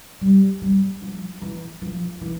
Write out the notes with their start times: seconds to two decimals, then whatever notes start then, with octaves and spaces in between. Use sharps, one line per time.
0.21 G3
0.62 G3
1.01 F3
1.41 E3
1.81 F3
2.21 E3